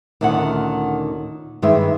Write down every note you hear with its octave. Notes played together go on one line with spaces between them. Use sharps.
D2 A#2 D#3 C#4 A4 F#5
G2 D#3 G#3 B4 E5